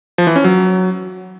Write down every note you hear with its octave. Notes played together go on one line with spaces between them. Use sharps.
F3
E3
C#4
F#3